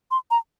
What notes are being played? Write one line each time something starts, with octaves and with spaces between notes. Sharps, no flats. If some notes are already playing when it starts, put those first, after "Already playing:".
C6
A#5